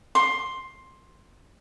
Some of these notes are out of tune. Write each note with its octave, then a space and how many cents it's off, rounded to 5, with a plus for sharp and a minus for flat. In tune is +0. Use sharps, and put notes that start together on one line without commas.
C6 +10